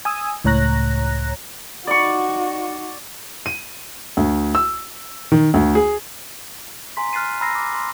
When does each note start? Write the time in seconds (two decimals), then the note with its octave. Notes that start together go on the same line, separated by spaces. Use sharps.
0.05 G#5 D#6 E6
0.44 C#2 A2 C#5 A#5 F#6 A#6
1.87 D#4 F#4 D5 C#6
3.46 D#7
4.17 D2
4.55 E6
5.32 D#3
5.54 D2
5.75 G#4
6.97 G#5 A#5 C6 B6
7.13 F6 F#6 A6 C7 D#7
7.41 A#5 B5 E6 A#6 C7
7.55 D6
7.75 C6